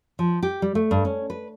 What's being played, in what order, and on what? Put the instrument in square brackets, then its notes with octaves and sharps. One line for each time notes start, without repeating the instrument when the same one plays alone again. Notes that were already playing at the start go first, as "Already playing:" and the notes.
[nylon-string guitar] F3
G4
G3
A3
G2
C#4
B4